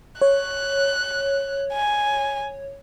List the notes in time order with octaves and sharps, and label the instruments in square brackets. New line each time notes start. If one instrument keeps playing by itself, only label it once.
[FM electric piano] C#5 [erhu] F#6
[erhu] G#5